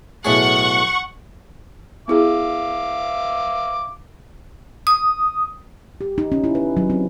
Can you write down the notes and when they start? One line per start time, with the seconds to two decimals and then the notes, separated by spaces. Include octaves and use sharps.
0.25 B1 A2 G#4 F#5 C#6
2.08 B3 E4 G#4 E5 F5 D6
4.87 D#6
6.01 G4
6.18 D#4
6.32 C#4
6.44 E4
6.55 B4
6.77 F#3
6.90 C4